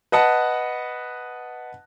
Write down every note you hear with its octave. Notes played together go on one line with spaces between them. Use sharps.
B4 D#5 F#5 A5